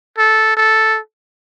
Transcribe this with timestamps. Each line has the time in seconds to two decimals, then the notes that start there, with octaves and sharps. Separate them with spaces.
0.18 A4
0.57 A4